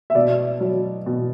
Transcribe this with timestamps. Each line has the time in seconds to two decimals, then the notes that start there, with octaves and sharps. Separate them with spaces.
0.10 E5
0.15 B2 D5
0.60 F#3
1.06 B2